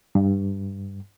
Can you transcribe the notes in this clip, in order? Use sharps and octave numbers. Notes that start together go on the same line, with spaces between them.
G2